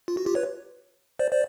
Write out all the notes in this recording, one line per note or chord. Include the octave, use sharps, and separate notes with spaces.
F4
F#4
F4 G4
B4 C#5
C5 D5
C5 D5